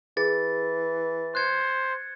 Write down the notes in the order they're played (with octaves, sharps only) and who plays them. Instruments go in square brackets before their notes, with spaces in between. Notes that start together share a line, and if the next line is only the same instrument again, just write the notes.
[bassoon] E3 [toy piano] G#4 [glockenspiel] A6
[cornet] C5 [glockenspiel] F#6 G#6 C#7